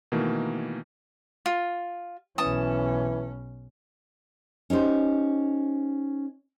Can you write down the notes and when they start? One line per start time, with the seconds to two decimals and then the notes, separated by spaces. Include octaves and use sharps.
0.12 B2 D#3 E3 A3 A#3
1.46 F4
2.38 B1 E3 C#4 A5 D#6
4.70 C#4 D#4 G4 C5